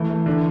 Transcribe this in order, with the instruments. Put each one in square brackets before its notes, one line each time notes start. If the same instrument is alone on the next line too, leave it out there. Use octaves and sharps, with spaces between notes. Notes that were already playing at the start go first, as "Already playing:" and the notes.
Already playing: [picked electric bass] E3 [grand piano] A3
[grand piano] A3
D3